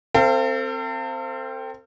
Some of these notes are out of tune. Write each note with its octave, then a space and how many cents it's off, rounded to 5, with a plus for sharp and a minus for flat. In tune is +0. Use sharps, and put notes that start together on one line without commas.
C4 +0 A4 +40 F5 -35